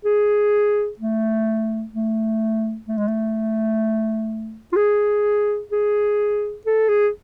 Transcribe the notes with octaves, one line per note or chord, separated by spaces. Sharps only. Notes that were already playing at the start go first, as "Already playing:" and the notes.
G#4
A3
A3
A3
G#3
A3
F4
G#4
G#4
A4
G#4